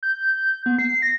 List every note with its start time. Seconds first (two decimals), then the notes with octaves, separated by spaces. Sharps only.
0.03 G6
0.66 B3
0.79 C7
1.02 A#6